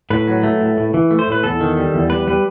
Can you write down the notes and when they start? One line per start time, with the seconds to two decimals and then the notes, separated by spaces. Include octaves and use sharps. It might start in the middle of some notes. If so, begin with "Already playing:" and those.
0.10 A2 B4
0.27 F#3
0.43 A3
0.61 A2
0.77 A2
0.94 E3
1.11 A3
1.19 C5
1.27 A2 B4
1.43 E2 A4
1.61 D#3
1.77 G3
1.94 E2
2.10 G3 B4
2.28 G3 B4